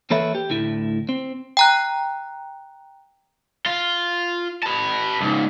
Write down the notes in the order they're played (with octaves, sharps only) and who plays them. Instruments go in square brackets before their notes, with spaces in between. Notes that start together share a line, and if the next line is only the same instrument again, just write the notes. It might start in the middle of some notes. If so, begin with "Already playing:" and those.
[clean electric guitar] E3 A#3 A4 B4 C#5 E5
G4
D2 A2 E4
C4
[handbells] G5 A#5 F#6
[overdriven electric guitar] F4
B4 A5
C#2 G#2